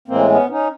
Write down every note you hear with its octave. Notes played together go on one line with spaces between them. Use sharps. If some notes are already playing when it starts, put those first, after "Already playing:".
A2 E3 G#3 A#3 C4
B3 C#4
C#4 D#4